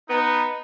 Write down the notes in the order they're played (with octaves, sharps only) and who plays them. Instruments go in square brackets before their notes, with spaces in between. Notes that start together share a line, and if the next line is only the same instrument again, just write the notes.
[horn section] B3 D#4